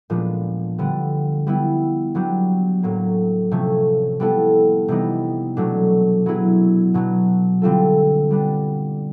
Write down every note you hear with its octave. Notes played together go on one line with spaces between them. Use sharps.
A#2 F3 G#3 B3 D4
D3 G3 B3
G3 B3 E4
F#3 B3 D4 G4
A2 F#3 A#3
C3 F3 A3 C#4
G3 B3 E4 A4
C3 E3 G3 B3 D#4
B2 F#3 A3 D4
F#3 B3 E4 G#4
B2 F#3 B3
D3 G3 C4 F4 A4
G3 B3 D4